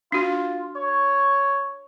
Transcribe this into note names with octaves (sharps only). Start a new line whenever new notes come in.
D4 F4 F#4
C#5